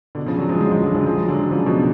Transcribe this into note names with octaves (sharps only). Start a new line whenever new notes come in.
B2 D3
C#3 F3
D3 F#3
F3 G#3
F3 G#3
F3 G#3
D3 F#3
C#3 F3
F3 G#3
D3 F#3
C#3 F3
B2 D3